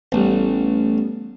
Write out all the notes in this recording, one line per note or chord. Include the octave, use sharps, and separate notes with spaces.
A1 G3 B3